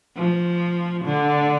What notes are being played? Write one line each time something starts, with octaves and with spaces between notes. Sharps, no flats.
F3
D3